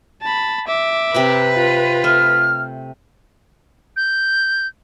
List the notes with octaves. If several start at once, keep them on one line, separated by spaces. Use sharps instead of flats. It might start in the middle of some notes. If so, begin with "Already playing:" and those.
A5 B5
E5 D6
C3 A#4 B4 B5
F4
A3 F6
G6